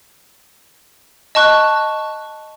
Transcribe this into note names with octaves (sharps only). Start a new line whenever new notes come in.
D#5 A5 C#6 F#6